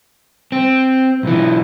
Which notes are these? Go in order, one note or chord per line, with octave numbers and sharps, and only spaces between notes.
C4
B1 E3